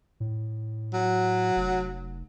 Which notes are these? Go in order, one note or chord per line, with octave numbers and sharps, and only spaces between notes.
A2
F#3
F1